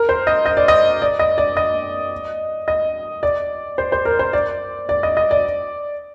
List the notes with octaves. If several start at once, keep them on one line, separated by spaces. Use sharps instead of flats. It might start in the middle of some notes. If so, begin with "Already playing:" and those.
Already playing: A#4
C5
D#5
D#5
D5
D#5
D5
D#5
D5
D#5
D#5
D5
C5
C5
A#4
C5
D5
D5
D#5
D#5
D5